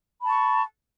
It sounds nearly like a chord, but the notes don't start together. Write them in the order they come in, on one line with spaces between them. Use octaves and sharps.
B5 A5 C#6